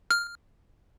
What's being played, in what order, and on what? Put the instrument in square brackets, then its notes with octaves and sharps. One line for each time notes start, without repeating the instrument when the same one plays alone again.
[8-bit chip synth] F6